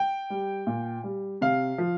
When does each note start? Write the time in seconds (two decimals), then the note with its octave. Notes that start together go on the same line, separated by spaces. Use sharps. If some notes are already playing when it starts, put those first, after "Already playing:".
Already playing: G5
0.30 G3
0.67 A#2
1.04 G3
1.41 C3 F5
1.78 F3